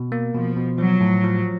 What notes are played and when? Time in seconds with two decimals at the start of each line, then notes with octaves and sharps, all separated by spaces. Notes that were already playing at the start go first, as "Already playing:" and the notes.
Already playing: B2
0.12 A#3
0.34 B2 F3
0.56 B2
0.78 F3 F#3
1.01 A2
1.24 F3